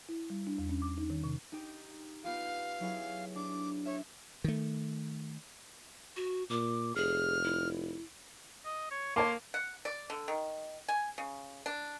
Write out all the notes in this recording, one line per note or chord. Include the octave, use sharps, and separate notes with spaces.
E4
G3
D4
E2
C#4
D6
D#4
D#3
C3
D#4 G4
B3 F4 G4 F5
F#3 E4 G#4
D4 D6
C#5 E5
D#3 A3
F#4
A#2 D6
F1 G#4 F6
E4
D#5
C#5
A#3 C#5 A5 C6 D6
F#5
D5
D3
D#3
G#5
C#3
D4